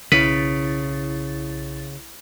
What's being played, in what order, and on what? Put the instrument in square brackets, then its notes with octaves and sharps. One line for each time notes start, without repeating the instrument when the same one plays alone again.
[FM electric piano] B1 E4 A6 [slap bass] C#3 [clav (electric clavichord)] B4